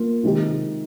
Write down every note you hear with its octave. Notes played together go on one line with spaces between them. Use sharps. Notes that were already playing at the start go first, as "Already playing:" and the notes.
Already playing: A#3 F4
C3 D#3 G#3 D#4 G4